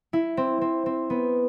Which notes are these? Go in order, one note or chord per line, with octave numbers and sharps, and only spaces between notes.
E4
C4
C4
C4
B3